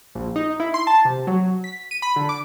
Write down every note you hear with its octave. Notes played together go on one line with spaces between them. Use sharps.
A#1
D#4
E4
C6
A5
C3
F#3
B6
D#7
B5
D3
D6